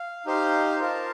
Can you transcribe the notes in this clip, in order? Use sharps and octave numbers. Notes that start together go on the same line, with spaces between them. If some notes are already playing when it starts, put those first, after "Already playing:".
Already playing: F5
D#4 G4 C5 F5
F4 A#4 F5 A5